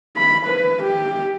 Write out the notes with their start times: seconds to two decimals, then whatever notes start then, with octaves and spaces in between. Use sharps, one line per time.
0.17 B5
0.46 B4
0.84 G4